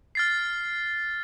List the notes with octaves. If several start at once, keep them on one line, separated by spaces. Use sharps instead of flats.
F6 A6 C7